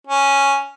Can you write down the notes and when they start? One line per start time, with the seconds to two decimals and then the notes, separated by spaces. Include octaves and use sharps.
0.07 C#4